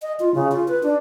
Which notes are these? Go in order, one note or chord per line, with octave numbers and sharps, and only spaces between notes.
D#5
F4
C#3
F4
B4
D4